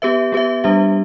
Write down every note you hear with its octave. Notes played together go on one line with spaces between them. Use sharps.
B3 G4 B4 E5
B3 G4 B4 E5
G3 D4 G4 E5